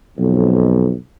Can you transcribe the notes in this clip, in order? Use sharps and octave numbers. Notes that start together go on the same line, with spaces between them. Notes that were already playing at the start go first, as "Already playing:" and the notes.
B1 F2